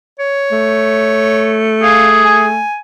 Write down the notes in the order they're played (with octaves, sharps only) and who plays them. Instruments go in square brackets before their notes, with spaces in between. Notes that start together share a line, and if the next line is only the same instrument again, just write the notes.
[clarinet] C#5
[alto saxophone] A3
[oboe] G#4 [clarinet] F5
[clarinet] G#5